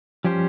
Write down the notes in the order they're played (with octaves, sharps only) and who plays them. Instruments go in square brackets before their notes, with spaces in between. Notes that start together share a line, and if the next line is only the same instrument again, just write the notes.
[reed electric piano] F3 [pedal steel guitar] G3 C#4 G4 C5